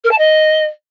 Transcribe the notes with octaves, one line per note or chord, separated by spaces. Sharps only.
A#4
A5
D#5